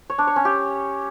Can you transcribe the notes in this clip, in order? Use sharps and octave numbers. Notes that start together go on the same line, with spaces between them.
C#5
D4
C#5
C#4
G4